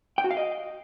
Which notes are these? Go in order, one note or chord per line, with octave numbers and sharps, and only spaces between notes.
G5
F#4
F5
D#5